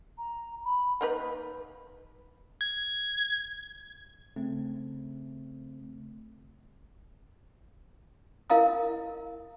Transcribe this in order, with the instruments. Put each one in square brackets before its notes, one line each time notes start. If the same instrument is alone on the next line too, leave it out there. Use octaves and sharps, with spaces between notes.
[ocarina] A#5
B5
[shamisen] A#3 D#4 B4
[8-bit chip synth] G#6
[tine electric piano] C#3 A3 C4
[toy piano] E4 A#4 D#5 F5 A#5 D#6